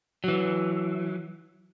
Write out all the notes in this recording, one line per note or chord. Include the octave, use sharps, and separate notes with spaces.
E3 F#3